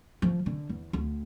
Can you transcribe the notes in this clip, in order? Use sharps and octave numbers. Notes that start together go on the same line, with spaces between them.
F3
D3
E2
D2